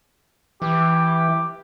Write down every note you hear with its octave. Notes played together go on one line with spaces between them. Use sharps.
E3 G4